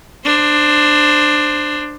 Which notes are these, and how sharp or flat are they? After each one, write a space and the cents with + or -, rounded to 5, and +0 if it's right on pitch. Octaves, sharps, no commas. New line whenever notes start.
D4 +15 C5 +0